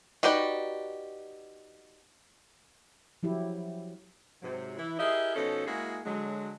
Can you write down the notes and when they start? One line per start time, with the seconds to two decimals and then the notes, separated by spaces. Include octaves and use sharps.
0.23 D#4 F#4 G4 B4 D5
3.23 F3 F#3 E4 G4
4.42 G#2 C3 F#3
4.78 E3 E4
4.99 E4 G4 G#4 A#4 D#5 E5
5.35 B2 F3 C#4 D#4 A4
5.67 G#3 A#3 E4 F#4 G#4
6.05 D3 F#3 G#3